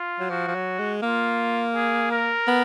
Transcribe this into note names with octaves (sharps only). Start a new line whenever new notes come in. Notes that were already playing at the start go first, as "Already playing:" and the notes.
Already playing: F4
F#3
F3 F#4
F3
F#3
G#3
A#3 F4
G#4
A#4
B3